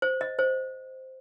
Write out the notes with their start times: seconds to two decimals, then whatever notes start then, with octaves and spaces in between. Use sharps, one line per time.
0.02 C5
0.21 D#5
0.39 C5